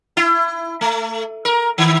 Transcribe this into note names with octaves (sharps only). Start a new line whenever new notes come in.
E4
A3
A#4
D#3